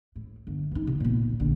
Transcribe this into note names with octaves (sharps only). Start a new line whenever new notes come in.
A2
G1
E3 D#4
C3
A#2 B3
A#1 D3